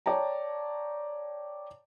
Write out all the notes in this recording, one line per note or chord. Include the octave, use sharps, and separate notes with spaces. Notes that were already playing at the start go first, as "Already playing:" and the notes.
C#5 D5 G5 A5 A#5